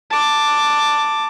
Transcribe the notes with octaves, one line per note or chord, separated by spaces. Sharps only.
A5 D6